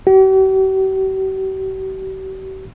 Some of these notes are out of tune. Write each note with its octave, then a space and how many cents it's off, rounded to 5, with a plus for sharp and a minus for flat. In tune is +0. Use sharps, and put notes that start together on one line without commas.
G4 -45